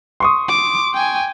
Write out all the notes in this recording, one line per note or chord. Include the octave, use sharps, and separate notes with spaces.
C6 C#6 D#6
D6
G5 G#5